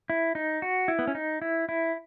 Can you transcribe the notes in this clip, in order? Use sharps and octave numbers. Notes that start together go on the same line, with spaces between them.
E4
D#4
F#4
E4
B3
C#4
D#4
E4
E4